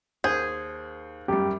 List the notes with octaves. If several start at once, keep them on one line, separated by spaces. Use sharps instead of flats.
D#2 G#4 C5 G6 G#6
F#2 G3 G4